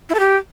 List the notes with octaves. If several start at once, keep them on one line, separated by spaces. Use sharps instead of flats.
E4
A4
G4